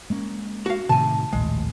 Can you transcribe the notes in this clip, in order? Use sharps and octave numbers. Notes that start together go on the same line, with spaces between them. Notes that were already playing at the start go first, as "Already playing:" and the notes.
G#3 A#3 C#4
F#4 F5
A2 C3 D#3 G#5 A5
A#1 D#2 A2 G#3